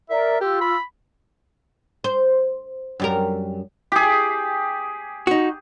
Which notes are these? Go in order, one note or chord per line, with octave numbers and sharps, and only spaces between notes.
A#4 D5 E5
F4 G4 E6
B5
C5
F#2 G3 A#4
G4 G#4
D#4 F#4